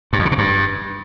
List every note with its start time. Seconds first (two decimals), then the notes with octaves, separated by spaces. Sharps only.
0.13 G2
0.19 F2
0.25 C#3
0.32 B2
0.38 G2